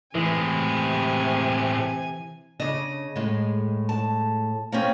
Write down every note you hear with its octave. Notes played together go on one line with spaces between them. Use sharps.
A2 C3 E3 G#3 G#5
C#3 D4 D#5
A2 G#3
A5
A#3 C4 C#4